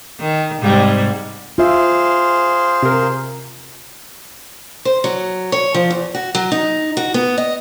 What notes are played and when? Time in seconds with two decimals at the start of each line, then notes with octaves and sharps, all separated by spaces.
0.20 D#3
0.62 G#2 C3 G3
1.58 F4 G#4 C5 E5 F5
2.83 C3 A#4
4.85 C5
5.04 F#3
5.52 C#5
5.74 F3
5.90 E2
6.15 F#4
6.35 F#3
6.52 D#4
6.97 F#4
7.14 B3
7.38 D#5